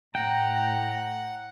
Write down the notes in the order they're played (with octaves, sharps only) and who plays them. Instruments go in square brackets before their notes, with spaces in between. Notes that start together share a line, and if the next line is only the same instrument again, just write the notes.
[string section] A2 [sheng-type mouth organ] F#5 [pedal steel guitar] G5 [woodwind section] A#5